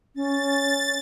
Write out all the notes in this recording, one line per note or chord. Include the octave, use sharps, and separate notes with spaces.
C#4 A6